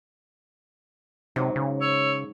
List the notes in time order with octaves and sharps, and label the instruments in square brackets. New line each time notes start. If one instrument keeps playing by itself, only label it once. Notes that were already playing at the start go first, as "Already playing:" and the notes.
[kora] G#2 F#3 [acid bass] C3
[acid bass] C#3
[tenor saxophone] C#5 [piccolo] E6